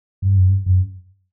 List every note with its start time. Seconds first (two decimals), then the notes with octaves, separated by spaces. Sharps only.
0.22 G2
0.36 F#2
0.49 G2
0.66 F#2